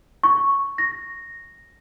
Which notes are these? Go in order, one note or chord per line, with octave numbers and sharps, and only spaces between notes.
C#6
A#6